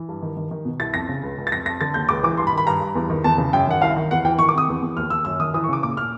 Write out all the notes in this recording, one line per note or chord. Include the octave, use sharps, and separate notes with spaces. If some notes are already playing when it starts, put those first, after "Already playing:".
Already playing: E3
G2
D#3
D#3
D#3
B2
C2 A6
F2 A#6
C#3
C#2
C#2
A6
F2 A#6
F2 A#6
D3 A6
D#2 G6
C#2 D6
E3 D6
G2 C6
B5
D#3
B5
G2 A#5
G2
E2
D#3
E2 A5
C#3
F#2 G5
D#3 F#5
C2 F5
D#3
E2 F#5
E3 G5
D#3 C#6
D6
C3 D#6
E2
E2
D#2 F6
D#2 E6
F#2 E6
D#3 D#6
E3 D#6
C#6
C#3 D6
A#2 D6
A#2 F6